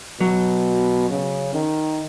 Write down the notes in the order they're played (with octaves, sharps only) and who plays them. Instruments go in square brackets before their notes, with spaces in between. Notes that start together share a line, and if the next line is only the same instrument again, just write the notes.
[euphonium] B2 [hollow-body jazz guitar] F#3
[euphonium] C#3
D#3